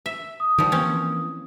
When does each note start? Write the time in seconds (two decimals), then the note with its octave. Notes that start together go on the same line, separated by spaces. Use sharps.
0.06 E5
0.40 D#6
0.58 D#3 F3 G3
0.72 E3 A#3 C4 C#4